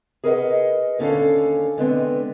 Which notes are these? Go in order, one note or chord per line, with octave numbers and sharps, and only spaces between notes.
G#4 A#4 B4 D5 D#5 F#5
D#2 D3 C#4 A4 C#5 F5
D3 G#3 B3 C4